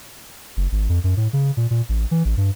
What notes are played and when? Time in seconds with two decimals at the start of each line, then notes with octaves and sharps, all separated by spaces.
0.57 F#1
0.72 G#1
0.89 F2
1.04 F#2
1.17 A2
1.33 C#3
1.57 A#2
1.71 A#2
1.89 A1
2.11 E3
2.25 A1
2.37 G2